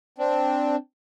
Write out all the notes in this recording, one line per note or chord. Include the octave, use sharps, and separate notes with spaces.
C4 D4